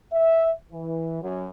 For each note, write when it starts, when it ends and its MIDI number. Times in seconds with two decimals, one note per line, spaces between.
0.12 0.50 76
0.73 1.20 52
1.22 1.47 42